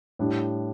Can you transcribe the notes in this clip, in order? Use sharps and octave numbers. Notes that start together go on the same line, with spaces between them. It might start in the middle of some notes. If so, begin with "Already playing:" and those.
A2 G3 D4